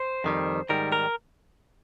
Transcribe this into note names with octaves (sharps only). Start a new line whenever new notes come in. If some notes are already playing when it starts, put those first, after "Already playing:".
Already playing: C5
F2 D#3 G3
G#2 D#3 G3 A#4
A#4